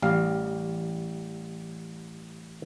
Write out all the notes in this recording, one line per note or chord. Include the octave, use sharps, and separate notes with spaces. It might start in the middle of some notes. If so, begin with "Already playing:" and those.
A1 G3 F5